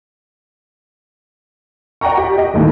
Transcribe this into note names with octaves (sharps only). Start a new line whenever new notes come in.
D5 F#5 G5 A#5 C#6
G4
D#5
G1 D#2 A2 D#3